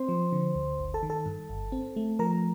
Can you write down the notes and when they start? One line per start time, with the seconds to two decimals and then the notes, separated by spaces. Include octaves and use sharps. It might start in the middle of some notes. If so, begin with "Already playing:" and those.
Already playing: C4 C5 C6
0.09 F3
0.32 D3
0.55 D2
0.79 G1
0.94 A4 A5
1.03 D#3
1.10 A4 A5
1.26 G2
1.49 G1
1.72 C4
1.96 A3
2.19 F3 A#4 A#5